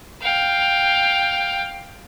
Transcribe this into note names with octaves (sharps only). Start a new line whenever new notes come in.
F5 G5